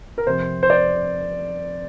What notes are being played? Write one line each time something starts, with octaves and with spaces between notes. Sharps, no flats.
A#4
F2 C3 C5
C5
D5
C5